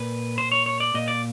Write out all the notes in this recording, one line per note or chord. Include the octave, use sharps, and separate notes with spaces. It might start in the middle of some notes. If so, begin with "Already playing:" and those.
Already playing: A#2 B4
C5
C#5
C#5
D5
A#2 D#5
D5